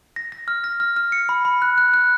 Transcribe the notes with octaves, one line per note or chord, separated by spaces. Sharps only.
A#6
A#6
F6
A#6
F6
F6
C#7
B5
B5
F#6
F#6
F#6